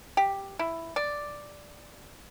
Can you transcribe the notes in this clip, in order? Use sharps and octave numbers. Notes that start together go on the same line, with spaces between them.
G4
E4
D5